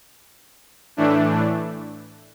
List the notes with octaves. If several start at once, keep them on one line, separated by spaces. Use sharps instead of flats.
A2 E3 A3 D4